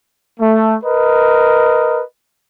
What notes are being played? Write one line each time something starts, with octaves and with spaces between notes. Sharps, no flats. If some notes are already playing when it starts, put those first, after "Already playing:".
A3
A#4 B4 D#5